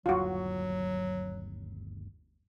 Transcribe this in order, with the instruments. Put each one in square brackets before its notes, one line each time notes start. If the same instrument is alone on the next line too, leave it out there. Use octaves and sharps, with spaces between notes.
[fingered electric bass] G1 D#2 [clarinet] F#3 [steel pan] F4 F#4